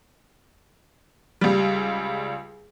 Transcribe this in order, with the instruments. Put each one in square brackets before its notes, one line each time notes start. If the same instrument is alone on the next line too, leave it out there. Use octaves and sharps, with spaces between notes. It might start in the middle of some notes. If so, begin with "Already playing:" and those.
[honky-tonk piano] C#2 G3